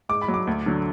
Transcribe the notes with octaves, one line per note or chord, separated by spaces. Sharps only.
G#2 D6
B5
F#3
D6
D2
D3 F#3